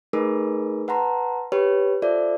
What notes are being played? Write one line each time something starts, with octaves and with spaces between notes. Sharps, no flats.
A3 D#4 G#4 A#4 B4
B4 F#5 A5 A#5 C6
G4 B4 C#5
F4 A4 C5 D5 E5